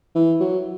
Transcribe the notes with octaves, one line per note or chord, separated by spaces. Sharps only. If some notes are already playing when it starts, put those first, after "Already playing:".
E3
F#3